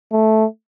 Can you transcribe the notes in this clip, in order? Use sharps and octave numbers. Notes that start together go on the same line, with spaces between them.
A3